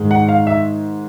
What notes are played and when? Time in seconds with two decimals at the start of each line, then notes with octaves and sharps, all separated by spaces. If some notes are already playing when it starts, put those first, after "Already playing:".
Already playing: G#2 D#3 G#3
0.11 F#5
0.29 F5
0.47 E5